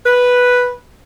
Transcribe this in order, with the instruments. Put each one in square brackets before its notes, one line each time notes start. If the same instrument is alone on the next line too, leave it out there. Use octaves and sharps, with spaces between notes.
[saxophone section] B4